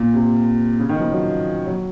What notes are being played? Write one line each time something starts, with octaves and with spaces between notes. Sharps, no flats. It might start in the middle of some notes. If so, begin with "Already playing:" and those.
Already playing: A#2
C3
C#3
D#3
F3
F#3
F#3